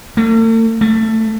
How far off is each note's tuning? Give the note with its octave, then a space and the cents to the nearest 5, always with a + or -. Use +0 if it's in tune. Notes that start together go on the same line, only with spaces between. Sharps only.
A3 +45
A3 +15